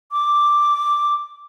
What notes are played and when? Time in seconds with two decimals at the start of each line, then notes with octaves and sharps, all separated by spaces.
0.12 D6